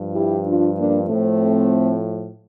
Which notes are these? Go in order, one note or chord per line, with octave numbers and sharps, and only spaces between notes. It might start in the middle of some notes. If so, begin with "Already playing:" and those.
Already playing: G2 F3
E4 G4
D4 F4
A#3 D4
A2 F3 A3 C4